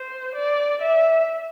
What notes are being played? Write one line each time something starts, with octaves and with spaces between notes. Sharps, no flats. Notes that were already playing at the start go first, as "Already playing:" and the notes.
Already playing: C5
D5
E5